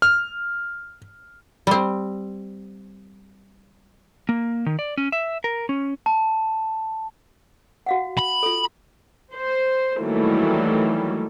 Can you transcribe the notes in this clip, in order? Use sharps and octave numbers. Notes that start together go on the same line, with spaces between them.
F6
G3 C4
A#3
D#3
D5
C#4
E5
A#4
C#4
A5
F#4 F5 F#5
B5
F4 A4
C5
D#3 E3 F#3 G3 A3 A#3